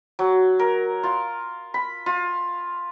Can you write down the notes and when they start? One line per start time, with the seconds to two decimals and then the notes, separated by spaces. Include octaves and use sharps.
0.19 F#3
0.59 A#4
1.03 F4
1.74 B5
2.06 F4